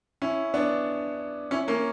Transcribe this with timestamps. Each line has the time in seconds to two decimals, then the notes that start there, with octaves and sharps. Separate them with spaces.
0.22 C#4 E4
0.54 B3 D4
1.51 C#4 E4
1.68 A#3 C#4